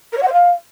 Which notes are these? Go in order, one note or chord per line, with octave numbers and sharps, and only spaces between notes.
A#4
C#5
F#5
C5
F5